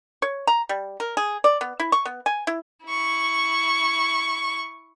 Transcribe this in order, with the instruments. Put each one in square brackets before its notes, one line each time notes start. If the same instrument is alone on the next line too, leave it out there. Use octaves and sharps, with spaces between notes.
[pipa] C#5
A#5
G3
A#4
G#4
D5
B3
E4
C#6
B3
G#5
E4
[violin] E4 C#6